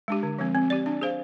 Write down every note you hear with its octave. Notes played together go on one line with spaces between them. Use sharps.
G#3 D4 G4
D3
F3 G#3 C4
C4
G4 D5
D4
G#4 C5 F5